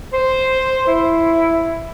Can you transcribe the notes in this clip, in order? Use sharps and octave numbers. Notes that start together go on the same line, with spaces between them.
C5
E4